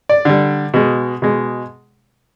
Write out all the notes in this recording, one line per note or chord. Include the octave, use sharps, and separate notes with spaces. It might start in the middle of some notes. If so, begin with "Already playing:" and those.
D5
D3 G3
B2 G#3
B2 G#3